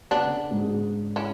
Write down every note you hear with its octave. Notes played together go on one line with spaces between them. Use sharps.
C#3 B3 D4
D3
G#2 G#3
G#2 G#3
C#4 E4